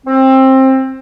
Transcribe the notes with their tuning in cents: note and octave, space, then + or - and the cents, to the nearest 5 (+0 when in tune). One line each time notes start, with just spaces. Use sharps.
C4 +20